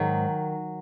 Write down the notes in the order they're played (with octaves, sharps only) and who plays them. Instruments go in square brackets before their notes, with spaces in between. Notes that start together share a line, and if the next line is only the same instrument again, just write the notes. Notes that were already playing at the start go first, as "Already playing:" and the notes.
Already playing: [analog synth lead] G#2 [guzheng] D#3 F#3